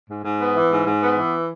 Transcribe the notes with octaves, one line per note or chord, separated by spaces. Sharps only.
G#2
G#2
B3
E3
G#2
G#2
B3
E3